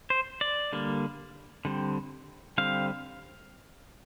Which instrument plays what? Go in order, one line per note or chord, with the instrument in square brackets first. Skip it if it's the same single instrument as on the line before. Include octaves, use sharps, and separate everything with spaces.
[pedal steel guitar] C5
D5
D3 G3 A#3
D3 G3 C4
D3 G3 C4 F5